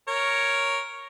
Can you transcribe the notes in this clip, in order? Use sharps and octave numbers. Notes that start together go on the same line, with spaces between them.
A#4 C#5